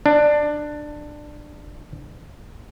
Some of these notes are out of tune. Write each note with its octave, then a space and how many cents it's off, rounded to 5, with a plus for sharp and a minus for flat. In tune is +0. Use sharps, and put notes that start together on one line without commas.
D4 +15